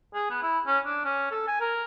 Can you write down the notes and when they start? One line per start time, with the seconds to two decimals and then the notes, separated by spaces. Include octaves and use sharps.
0.14 G#4
0.30 B3
0.43 E4
0.67 C#4
0.86 D4
1.05 C#4
1.31 A4
1.48 G#5
1.60 A#4